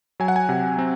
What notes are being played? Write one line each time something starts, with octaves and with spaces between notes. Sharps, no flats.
F#3 G#5
F#5
G#5
C3
C4